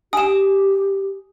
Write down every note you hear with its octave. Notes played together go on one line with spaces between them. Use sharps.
G4 G#5 D#6 E7